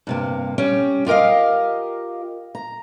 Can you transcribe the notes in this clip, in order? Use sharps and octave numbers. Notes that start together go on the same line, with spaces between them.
G2 C3 A#3
G3 C#4 G5
F4 G4 A#4 D#5 F5
A#5